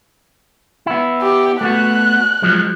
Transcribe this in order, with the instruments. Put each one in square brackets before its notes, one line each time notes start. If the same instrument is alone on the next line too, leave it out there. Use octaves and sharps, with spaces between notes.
[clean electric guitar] B3 E4
[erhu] G4
[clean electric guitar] A3 B3 F#4 [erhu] F#6
[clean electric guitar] F3 F#3 G#3